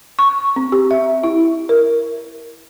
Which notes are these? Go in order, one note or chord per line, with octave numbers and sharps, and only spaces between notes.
C#6
C4
G4
E5
E4
A#4